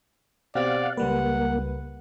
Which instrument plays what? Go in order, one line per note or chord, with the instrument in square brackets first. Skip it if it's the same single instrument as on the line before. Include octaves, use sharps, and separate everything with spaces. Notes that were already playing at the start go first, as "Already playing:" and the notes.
[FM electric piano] B2 C4 G4 [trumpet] D5 [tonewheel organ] F5 F#5
[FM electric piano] C#2 G3 B4 [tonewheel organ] A#3 [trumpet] F#5